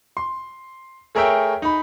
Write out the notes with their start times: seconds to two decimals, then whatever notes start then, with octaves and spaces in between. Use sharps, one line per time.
0.17 C6
1.15 A3 G#4 A#4 C#5 E5 G5
1.62 D#4 B5